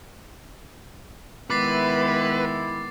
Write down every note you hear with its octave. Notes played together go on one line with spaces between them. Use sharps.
D#3 G#3 B3 E4 B4 D6 A6 C7